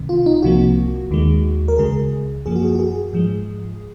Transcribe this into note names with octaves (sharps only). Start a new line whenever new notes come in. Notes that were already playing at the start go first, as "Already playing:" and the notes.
Already playing: C#2 C3 D#3
F4
D#4
C2 C3 F3 A#3 F#4
D#2 D#3 G#3
A#4
C#2 C#3 G#3 G#4
F#2 F3 A#3 G#4
F#4
G#4
F#4
G#4
G#2 F3 G#3